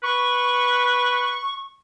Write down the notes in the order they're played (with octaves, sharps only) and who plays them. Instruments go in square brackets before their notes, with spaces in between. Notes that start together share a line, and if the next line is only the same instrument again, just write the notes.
[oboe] B4 [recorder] C#6